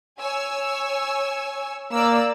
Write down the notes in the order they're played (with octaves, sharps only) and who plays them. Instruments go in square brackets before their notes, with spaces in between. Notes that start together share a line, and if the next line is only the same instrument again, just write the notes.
[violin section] C#5 G#5 E6
[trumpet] A#3 [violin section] D5 E6